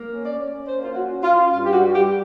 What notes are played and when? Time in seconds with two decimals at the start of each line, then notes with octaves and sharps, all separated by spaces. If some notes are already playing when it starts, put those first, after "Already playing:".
Already playing: A#3
0.11 C#4
0.25 D5
0.39 C#4
0.68 A#3 C5
0.84 F4
0.95 C#4 F#4
1.23 C#4 F4
1.52 G2 F4
1.65 G4
1.73 F#4
1.80 G3
1.95 G4